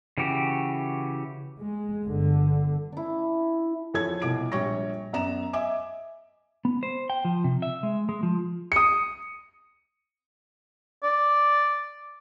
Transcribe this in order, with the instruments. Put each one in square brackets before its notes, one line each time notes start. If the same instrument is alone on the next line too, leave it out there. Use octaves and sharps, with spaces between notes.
[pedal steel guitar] C#3 E3 F#4 G4
[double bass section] G#3
G1 D3
[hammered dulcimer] D4 E4
[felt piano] E2 F3 A4 C#5 G#6
C2 B2 D6 D7
A#1 G3 G4 C#5 C#6 A#6
F#2 B3 D5 A#5 E7
D#5 E5 G#5 D6
[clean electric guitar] B3
C5
G5
F3
C3
E5
G#3
G#3
F3
[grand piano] D#6 C#7
[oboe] D5